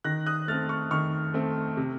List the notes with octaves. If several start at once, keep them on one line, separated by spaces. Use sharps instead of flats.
D#3 F#6 A#6
D#6 F#6
A3 C4 F6 A6
C#6 F6
D#3 C#6 F6
A3 C4
C3